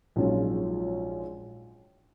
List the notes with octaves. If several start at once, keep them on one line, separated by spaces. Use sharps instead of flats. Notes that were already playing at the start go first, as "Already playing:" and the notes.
A#1 G#2 F#3 C#4 F4